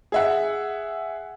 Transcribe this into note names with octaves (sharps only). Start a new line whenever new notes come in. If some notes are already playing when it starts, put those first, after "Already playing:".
G#4 E5 F#5